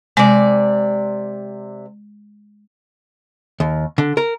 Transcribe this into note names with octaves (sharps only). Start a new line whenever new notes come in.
C3 G#3 D5
D#2
D3
A#4